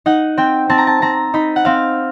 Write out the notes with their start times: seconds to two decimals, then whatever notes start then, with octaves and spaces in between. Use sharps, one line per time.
0.06 D#4 F#5
0.37 C4 G5
0.69 C4 A5
0.78 A#5
0.87 A5
1.02 C4 A#5
1.34 D#4 B5
1.56 F#5
1.65 C4 F5